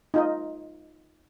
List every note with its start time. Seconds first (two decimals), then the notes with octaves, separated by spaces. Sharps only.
0.14 D#4 F4 D#5